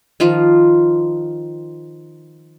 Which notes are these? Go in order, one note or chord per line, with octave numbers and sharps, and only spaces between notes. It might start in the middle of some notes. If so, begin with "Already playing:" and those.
D#3 F3 F4